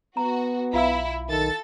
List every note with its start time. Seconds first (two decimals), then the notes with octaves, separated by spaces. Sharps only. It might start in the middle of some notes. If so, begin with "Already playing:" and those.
0.17 B3 F#4 A#5
0.73 B1 E4 F4 F5 E6
1.29 D#3 A4 A6